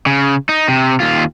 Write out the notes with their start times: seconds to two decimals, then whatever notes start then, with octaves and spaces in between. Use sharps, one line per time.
0.06 C#3
0.49 D#4
0.68 C3
1.00 D#2 F4